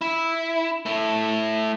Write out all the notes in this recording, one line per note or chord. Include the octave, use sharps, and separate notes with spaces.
E4
A3 E4